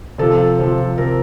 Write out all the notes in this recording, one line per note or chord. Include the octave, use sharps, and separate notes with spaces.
C3 F3 A4
C3 F3
C3 F3 A#4